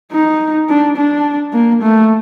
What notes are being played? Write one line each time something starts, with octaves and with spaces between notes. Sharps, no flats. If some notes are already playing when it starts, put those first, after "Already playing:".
D#4
D4
D4
A#3
A3